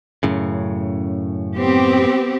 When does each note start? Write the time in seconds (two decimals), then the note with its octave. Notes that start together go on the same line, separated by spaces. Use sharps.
0.23 F#2 A2 C#3
1.56 B3 C4 G4